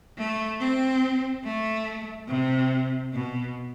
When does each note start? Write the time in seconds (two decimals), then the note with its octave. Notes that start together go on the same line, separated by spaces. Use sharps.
0.17 A3
0.59 C4
1.44 A3
2.28 C3
3.12 B2